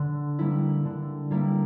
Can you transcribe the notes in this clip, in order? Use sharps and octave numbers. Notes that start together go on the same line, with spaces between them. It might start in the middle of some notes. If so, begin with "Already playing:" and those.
Already playing: D3
G3 A#3 E4
D3
G3 A#3 E4